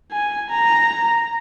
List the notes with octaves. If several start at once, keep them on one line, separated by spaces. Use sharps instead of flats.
G#5
A#5